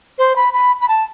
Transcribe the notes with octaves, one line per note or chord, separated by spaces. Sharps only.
C5
B5
B5
B5
A5